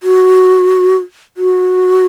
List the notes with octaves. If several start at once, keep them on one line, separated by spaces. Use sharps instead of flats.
F#4
F#4